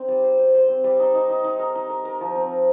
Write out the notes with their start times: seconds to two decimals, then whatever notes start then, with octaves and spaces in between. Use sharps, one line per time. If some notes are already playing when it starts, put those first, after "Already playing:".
Already playing: C4 D#4
0.08 G3
0.23 C5
0.39 C5
0.54 C5
0.68 C4
0.84 G3
1.00 D#4
1.15 D#4
1.30 D#4
1.44 D#4
1.60 A#4
1.75 D#4
1.90 A#4
2.05 A#4
2.21 F3
2.35 C4
2.51 A#4